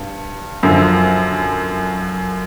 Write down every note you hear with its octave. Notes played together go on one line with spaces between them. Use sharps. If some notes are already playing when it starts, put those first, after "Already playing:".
Already playing: G2
F#2 D3 F3